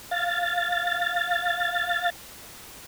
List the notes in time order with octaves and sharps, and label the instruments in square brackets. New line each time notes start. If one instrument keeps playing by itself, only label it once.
[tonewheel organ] F5 A6